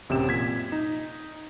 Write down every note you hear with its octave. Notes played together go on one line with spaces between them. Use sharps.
A1 F#2 C3 C4 E7
A#2 G#6 B6
D#4